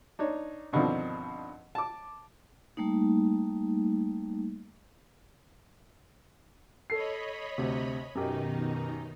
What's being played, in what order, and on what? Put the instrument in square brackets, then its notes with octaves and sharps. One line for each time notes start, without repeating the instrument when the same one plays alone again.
[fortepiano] D4 D#4 C#5
G2 B2 D3 D#3 F3 C4
A5 D6
[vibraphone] G3 A3 A#3 D#4
[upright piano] A4 C7 [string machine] C#5 D#5 B5
[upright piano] D2 C3
[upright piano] F#2 G4 [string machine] B2 D#3 D#4